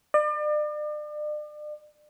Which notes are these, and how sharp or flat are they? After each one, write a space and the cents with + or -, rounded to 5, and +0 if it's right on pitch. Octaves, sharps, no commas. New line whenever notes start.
D5 +40